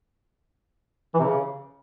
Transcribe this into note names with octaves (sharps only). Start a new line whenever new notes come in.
E3
C3
C#3